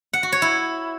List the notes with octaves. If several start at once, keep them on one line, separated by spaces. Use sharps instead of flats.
F#5
F#4
C#5
E4